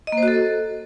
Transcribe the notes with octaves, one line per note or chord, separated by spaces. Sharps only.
D#5
A#3
C5
F#4
A4